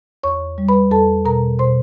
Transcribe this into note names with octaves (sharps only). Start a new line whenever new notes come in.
E2 C#5 C#6
G3
B4 B5
E2 A4 A5
B2 A#4 A#5
B2 C5 C6